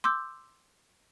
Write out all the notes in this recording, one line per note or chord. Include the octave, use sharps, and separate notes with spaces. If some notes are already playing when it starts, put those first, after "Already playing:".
C6 D6 E6 G6